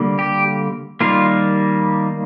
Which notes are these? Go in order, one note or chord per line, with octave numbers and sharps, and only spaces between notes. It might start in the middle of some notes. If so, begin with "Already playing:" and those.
Already playing: D3 G3 A#3
G4
D#3 G3 A#3 F4